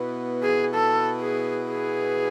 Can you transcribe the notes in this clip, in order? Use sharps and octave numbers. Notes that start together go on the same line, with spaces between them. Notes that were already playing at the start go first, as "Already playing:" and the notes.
Already playing: B2 B3 E4 B4
G#4
A4
G#4
G#4